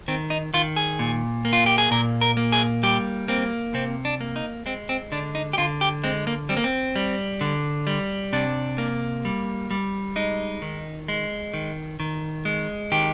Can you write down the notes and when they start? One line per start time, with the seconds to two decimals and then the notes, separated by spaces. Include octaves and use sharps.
0.08 D#3 C4
0.30 D#4
0.54 D#3 F4
0.76 G#4
0.99 A#2
1.45 A#3
1.53 F4
1.66 G4
1.78 G#4
1.91 A#2 A#4
2.21 A#4
2.37 A#3
2.52 G#4
2.83 G3 G4
3.28 A#3 C4
3.74 C3 C4
4.05 D4
4.21 A#3
4.36 D#4
4.66 G#3 C4
4.89 C4
5.12 D3 D4
5.35 D#4
5.53 G4
5.58 D3 F4
5.81 G4
6.04 G#3 C4
6.27 A#3
6.49 G3 C4
6.57 A#3
6.64 C4
6.96 G3
7.41 D3
7.87 G3
8.33 C3 D4
8.78 A#3
9.25 G3
9.71 G3
10.16 G#3 D#4
10.62 D#3
11.08 G#3
11.54 D#3
12.00 D#3
12.45 G#3
12.92 D#3 G4